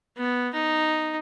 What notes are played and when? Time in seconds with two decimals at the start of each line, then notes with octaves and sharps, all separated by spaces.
0.17 B3
0.54 D#4